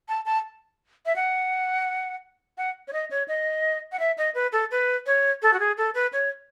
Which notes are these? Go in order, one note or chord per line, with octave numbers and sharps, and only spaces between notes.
A5
A5
E5
F#5
F#5
C#5
D#5
C#5
D#5
F#5
E5
D#5
B4
A4
B4
C#5
A4
F#4
G#4
A4
B4
C#5